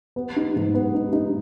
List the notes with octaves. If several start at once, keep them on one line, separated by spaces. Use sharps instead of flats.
B3
D#4
G#2
B3
D#4
D#4